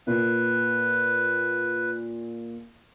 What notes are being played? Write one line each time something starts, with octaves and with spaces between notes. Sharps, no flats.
A#2 B4